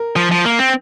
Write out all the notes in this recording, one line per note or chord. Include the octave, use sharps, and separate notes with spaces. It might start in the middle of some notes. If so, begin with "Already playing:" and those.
Already playing: A#4
F3
F3
A#3
C4